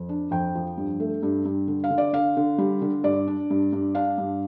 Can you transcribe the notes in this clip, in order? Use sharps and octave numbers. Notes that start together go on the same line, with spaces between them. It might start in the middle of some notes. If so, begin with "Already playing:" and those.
Already playing: F2
D4
F2 G5
F3
G2
A3
G2
G2
D3
F5
D3
D5
D3 F5
D3
G3
D3
G2 D5
D4
G2
G2
D4 F5
G2